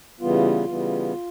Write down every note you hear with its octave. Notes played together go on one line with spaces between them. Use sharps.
C#3 E3 G3 B3 F4
C#3 E3 G3 B3